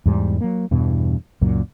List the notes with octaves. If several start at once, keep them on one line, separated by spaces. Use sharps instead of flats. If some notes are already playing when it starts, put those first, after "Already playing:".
E2 G#2 G3
F#3 A#3
E2 G2 B2 E3
C#2 F#2 A#2 F#3